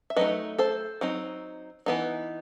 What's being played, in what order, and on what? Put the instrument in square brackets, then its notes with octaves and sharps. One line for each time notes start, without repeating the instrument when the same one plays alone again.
[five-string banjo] E5
F#3 A3 D#4 B4 D#5
A4 C5
F#3 C4 D#4
E3 B3 D#4